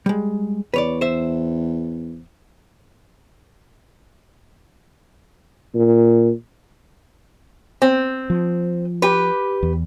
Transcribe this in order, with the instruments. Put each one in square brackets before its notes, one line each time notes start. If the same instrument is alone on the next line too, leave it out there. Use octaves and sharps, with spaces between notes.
[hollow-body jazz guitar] G3 G#3
[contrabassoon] E2 [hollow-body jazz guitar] B4 C#5 D5
[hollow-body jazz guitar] C5 E5
[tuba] A#2
[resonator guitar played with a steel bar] C4
[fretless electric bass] F3
[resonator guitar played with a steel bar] G4 B4
[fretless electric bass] E2